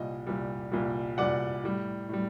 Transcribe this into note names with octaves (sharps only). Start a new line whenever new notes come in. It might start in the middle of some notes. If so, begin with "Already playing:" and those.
Already playing: C2 A#2 G3 D#5
C2 A#2 G3
C2 A#2 G3
C2 A#2 G3 D5 F#5
A2 G3
A2 G3